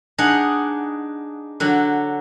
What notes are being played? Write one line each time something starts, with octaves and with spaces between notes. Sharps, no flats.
D4 D#4 G#4 D#5 F#5
D3 F#3